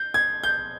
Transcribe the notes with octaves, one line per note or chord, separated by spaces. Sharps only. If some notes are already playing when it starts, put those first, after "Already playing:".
Already playing: G6
G#6
G6